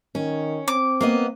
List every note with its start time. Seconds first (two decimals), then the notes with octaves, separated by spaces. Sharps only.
0.15 D#3 C#4
0.68 C4 D6
1.01 A#3 B3 D#5